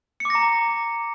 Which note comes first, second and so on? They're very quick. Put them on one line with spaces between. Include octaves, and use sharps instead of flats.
C#7 D6 A#6 A#5